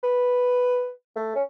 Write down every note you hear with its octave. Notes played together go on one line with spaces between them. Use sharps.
B4
A3
C#4